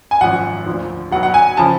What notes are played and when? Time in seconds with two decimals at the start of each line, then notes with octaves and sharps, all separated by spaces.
0.11 G#5
0.21 G#1 F#2 F3 F#5
0.66 D2 D3 F3
1.11 B1 B2 F#3 F#5
1.23 F#5
1.34 G#5
1.57 C#3 F3 A5